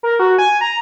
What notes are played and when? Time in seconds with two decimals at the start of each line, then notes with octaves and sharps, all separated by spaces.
0.03 A#4
0.19 F#4
0.38 G#5
0.61 A#5